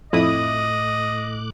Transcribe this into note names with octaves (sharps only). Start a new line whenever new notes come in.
F2 A2 E4 D#5 D6 D#6 F#6